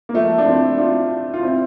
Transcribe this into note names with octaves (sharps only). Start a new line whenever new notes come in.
A#3
F3 A3
D4
C4 E4
D4 F4
F4
C4 E4